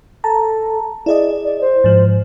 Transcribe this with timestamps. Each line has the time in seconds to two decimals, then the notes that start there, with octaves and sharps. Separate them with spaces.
0.24 A4 A5 A#5
1.06 E4 G#4 D5 D#5
1.44 D5
1.61 C5
1.84 G#2 F3